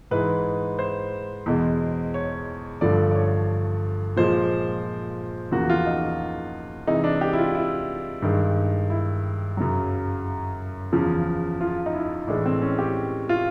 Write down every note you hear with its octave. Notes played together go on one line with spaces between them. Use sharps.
G#2 E3 G#3 B4
C5
E2 B2 G#3
C#5
G2 D3 F3 A3 D5
D5
C#5
A#2 F3 G#3 C5
E2 C#3 F3 A#3 F#4
F4
D#4
C3 E3 G#3 D#4
D4
G4
E4
F4
E4
G2 D#3 G#3
E4
F#2 C#3 F#3
E2 C#3 F3
F4
D#4
E4
A2 E3 G#3 D4
C4
C#4
G4
F4